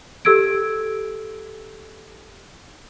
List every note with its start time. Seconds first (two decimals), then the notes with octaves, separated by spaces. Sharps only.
0.25 G4 A4 E6 G#6 D7